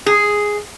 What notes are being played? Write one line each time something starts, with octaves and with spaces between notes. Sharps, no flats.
G#4